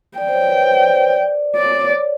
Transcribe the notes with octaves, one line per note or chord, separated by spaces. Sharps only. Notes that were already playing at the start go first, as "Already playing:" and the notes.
D5 G5
C5
C#5
B4
C5
D5
C5
D5
C#5 D5